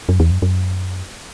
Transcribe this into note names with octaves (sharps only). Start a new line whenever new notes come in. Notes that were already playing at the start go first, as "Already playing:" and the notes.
F#2
E2
F#2
F#2